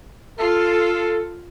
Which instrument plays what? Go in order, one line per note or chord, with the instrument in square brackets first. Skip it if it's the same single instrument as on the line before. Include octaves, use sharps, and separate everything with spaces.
[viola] F4 [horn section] A4